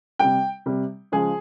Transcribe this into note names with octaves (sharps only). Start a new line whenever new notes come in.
C3 G3 G5
C3 G3
C#3 F3 G#3 G#4